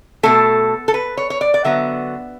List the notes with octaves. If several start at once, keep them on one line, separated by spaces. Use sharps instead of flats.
B2 A3 A4
A4
B4
C#5
C#5
D5
D5
D3 F#3 B3 E5